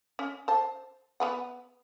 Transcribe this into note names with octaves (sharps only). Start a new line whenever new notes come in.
C#4
C5 A5
B3 B4 F#5